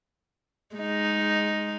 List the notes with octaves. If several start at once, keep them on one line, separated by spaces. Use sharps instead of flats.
G#3 D#4